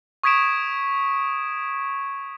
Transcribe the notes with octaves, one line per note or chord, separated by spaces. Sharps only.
C#6 D#6 G#6 B6 D7 E7